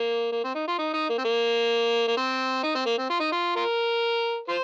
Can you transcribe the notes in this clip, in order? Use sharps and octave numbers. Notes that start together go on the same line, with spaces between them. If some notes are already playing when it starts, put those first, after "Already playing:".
Already playing: A#3
A#3
C4
D#4
F4
D#4
D#4
A#3
C4
A#3
A#3
C4
D#4
C4
A#3
C4
F4
D#4
F4
F4 A#4
F4 C5